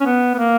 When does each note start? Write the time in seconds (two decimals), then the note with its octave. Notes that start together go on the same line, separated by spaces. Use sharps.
0.01 C#4
0.06 B3
0.34 B3
0.38 A#3